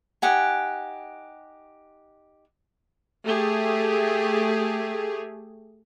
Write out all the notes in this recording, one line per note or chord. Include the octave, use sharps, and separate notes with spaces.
D#4 G4 F#5 G#5
A3 G4 G#4